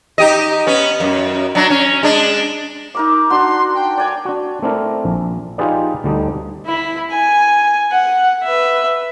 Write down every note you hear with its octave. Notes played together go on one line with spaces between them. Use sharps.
D#4 G4 D#5
B3 C#4
F#2
F#3 D4
C#4
G#3 D4
D#4 A#4 D6
D4 F#4 C6
G5
D5 G#5 A#5
D4 F#4
A3 C4 D4 E4 A#4
A#1
D#4 F4 G4 G#4 B4 D5
D2 D3 G3 D4 D#4
E4 B5
G#5
F#5
B4 E5